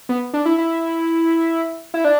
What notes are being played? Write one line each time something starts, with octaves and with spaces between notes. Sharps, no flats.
B3
D4
E4
E4
E4
D4